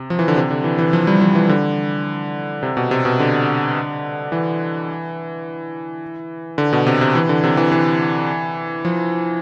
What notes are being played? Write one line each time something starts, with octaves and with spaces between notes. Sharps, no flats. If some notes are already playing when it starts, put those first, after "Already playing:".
Already playing: C3
F3
E3
D3
C3
D3
E3
E3
F3
G3
F3
E3
D3
C3
B2
C3
B2
D3
E3
D3
B2
C3
C3
E3
D3
C3
E3
E3
F3